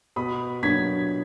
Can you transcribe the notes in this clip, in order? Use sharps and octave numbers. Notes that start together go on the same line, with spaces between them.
B2 B5 D#6
F#3 A#3 D4 G#6 B6